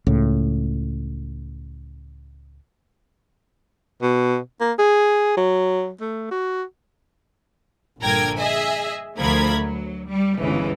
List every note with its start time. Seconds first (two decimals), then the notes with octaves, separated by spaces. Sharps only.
0.07 C#2 A2
4.02 B2
4.61 A#3
4.79 G#4
5.37 F#3
6.01 A3
6.31 F#4
8.00 A#1 G2 D3 A#4 G5 G#6
8.38 G#4 D#5 E5 G#5
9.18 D2 F3 A3 A#4 B5 G#6
9.61 F#3
10.08 G3
10.38 G1 C#2 C#3 E3